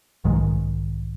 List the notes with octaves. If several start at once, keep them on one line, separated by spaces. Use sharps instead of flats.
B1 G#2 D#3 G#3